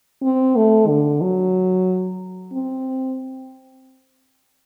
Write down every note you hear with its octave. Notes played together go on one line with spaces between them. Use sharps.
C4
A3
D3
F#3
C4